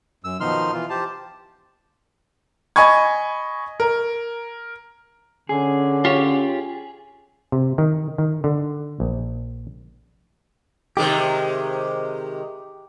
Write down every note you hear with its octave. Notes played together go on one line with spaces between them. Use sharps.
F#2 E6
B2 D#3 F3 D#4 C6 F6
E3 F4
G4 C5 A5
D#5 G#5 B5 C#6 G#6
A#4
D3 C#4 G#4
F4 G4 C#5
C3
D#3
D#3
D3
A#1
C3 D#3 G#3 G4